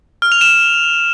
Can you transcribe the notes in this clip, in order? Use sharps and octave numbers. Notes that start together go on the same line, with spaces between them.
F6
F7
E7